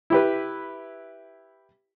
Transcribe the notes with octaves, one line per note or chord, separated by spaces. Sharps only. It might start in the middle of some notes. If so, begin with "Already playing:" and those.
E4 G4 B4